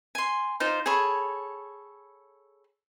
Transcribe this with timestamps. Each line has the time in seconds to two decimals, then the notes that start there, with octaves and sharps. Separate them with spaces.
0.15 G#5 C6
0.60 D#4 F4 C5
0.86 G#4 A4 C#5 B5